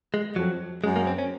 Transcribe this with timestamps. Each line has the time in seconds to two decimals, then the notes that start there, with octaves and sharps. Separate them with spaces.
0.14 G#3
0.36 F2 F#3
0.83 F#2 G#3
0.96 A#3
1.07 C4
1.18 C#4